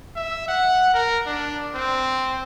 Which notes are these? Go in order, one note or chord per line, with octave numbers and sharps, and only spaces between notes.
E5
F#5
A#4
D4
C4